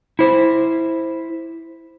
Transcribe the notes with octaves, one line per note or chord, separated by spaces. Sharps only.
E4 C5